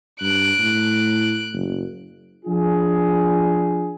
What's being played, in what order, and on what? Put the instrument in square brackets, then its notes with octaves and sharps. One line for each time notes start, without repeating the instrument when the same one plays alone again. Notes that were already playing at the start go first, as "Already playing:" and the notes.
[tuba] G2 [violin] F#6 D7
[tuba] A2
F#1
[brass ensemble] F3 D4 F4 G#4